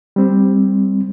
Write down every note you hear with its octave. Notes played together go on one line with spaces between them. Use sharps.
G3 C4